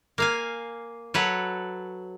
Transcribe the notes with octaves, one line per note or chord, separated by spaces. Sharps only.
A#3 F5 G#5
F#3 A4 B4 C#5 F#5